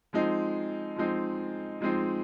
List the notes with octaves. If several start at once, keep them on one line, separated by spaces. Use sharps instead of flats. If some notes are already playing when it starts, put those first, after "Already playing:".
F3 G#3 C4 D#4
F3 G#3 C4 D#4
F3 G#3 C4 D#4